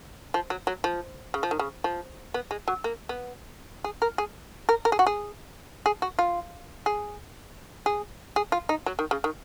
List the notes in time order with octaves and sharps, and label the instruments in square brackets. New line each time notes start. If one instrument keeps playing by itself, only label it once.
[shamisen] F3
F#3
F#3
F3
C#3
F3
D#3
C#3
F3
B3
G#3
F#3
A#3
B3
G#4
A#4
G#4
A#4
A#4
G#4
F#4
G#4
G#4
F#4
F4
G#4
G#4
G#4
F4
D#4
F#3
D#3
C#3
D#3